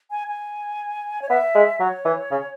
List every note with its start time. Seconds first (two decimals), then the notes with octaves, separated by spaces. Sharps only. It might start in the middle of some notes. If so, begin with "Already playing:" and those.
0.11 G#5
0.28 G#5
1.22 C#5
1.29 B3 E5
1.55 G#3
1.80 F#3 C#5
2.05 E3
2.31 C#3